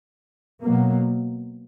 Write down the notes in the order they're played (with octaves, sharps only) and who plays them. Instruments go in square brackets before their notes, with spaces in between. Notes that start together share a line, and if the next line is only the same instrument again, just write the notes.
[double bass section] B2 F#3 A#3